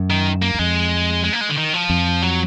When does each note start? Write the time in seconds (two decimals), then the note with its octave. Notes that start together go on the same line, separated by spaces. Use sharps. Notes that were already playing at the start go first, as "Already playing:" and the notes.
Already playing: F#2
0.10 D#3
0.42 A#3
0.55 F#2
0.59 F2 G#3
1.24 G#3
1.33 A#3
1.41 G#3
1.49 D3
1.57 D#3
1.74 F3
1.90 F2
2.22 F#3